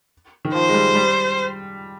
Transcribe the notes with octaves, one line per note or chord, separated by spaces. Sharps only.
D#3
F3 C5
G#3
G3
G3